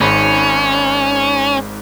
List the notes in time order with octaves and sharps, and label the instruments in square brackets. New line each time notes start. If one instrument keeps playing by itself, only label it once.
[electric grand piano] G#1 G#2 B5 [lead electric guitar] C#4